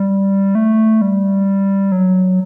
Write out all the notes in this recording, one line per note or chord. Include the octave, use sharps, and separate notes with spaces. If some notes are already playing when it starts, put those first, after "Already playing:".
Already playing: G3
A3
G3
F#3